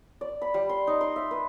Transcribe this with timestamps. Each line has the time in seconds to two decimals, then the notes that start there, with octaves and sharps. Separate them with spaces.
0.21 D5
0.42 B5
0.54 G3
0.69 C6
0.87 D#4
1.01 C6
1.16 E5
1.31 B4